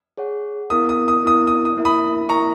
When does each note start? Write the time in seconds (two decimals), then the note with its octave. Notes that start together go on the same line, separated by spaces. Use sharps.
0.17 G#4 C#5 F#5
0.70 B3 E4 A#4 D#6
0.89 D#6
1.08 D#6
1.23 B3 E4 A#4 D#6
1.47 D#6
1.65 D#6
1.77 A#3 E4 A#4 E5
1.85 B5 D#6
2.29 A#3 E4 A#4 E5 A#5 C#6